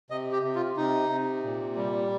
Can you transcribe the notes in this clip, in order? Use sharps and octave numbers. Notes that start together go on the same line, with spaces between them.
C3 D#5
G4
C3
F4
C3 D#4
C3
A#2
G3